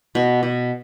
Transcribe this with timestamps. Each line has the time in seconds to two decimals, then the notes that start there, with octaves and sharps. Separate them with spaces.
0.15 B2
0.43 B2